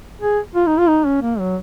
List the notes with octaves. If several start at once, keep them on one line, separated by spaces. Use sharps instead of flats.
G#4
F4
D#4
F4
D#4
C#4
A#3
F#3